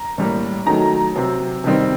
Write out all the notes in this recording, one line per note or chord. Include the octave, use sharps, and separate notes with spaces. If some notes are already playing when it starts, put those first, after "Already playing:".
Already playing: A#5
A2 G3 A#3
D#3 F#3 A3 A#5
C3 F#3 C4
C3 D#3 G3 C4